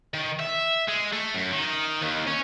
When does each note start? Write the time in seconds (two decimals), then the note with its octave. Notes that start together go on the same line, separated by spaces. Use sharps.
0.14 D#3
0.39 E5
0.88 G#3
1.13 A3
1.34 F#2
1.53 D#3
2.01 D#2
2.27 C#4